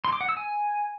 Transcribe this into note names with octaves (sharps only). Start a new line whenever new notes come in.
C6
D6
F#5
E6
G#5